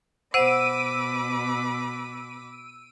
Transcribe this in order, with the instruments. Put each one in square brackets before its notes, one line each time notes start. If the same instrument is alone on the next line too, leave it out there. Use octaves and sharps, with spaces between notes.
[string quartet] B2 B5 D6 [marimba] C5 F#5 [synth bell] E6 D7 D#7